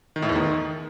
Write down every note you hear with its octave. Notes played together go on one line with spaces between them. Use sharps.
D#3
A2
E2
D#3